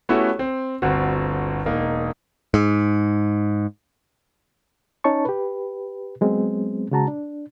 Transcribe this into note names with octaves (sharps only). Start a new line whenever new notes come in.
A3 B3 C#4 E4 F#4 G4
C4
G1 D2 C4 F#4
E1 A#3 D#4
G#2
C#4 D#4 C#5 A5 C#6
G4 B4
F#3 G#3 B3 C4
C#3 G#3 F#4 A5 A#5
D4